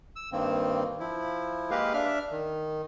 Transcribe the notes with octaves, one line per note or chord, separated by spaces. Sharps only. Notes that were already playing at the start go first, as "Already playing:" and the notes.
E6
G2 D#3 A#3 C4
F3 E4
G#3 A#3 G4 A#4 B4 F5
D4 E5 F6
D#3